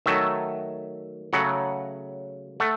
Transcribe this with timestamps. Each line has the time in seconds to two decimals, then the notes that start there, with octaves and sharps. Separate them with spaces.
0.06 D#3 F#3 A3 E5
1.33 C#3 F#3 A3 F#5
2.60 A3 F#5